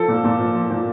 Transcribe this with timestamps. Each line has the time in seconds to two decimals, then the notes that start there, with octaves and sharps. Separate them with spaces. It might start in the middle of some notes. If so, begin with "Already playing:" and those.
Already playing: F3 A4
0.08 A#2
0.24 A#2
0.39 F3
0.55 F3
0.71 A#2